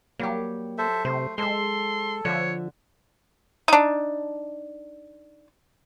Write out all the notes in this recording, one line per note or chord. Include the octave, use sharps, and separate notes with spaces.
F#3 G3 A#3 G4
A4 C5 E5
C3 A3 C5
G#3 A4 C5 E5 C6
D3 F3 C#5 E5
D4 D#4